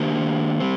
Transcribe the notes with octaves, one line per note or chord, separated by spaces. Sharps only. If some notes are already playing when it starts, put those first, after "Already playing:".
Already playing: D#3 A#3 D4 G4 C5
G3 C4